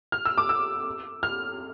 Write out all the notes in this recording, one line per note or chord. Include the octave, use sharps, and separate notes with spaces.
F6
E6
D6
E6
F6